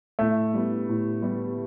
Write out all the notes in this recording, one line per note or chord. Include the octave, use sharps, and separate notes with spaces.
A2 A3
G3 B3 E4
A2
G3 B3 E4